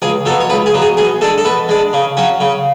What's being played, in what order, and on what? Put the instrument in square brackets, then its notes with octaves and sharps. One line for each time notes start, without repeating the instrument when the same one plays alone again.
[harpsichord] C#2 G#4
F#3 A4
B2
C#5
C#2 B4
G#4
B2 F#3
G#4
B2 G#4
G#3 D4 A4
A4
B2 B4
G#3 D4
C#3
F#3 C#4
C#3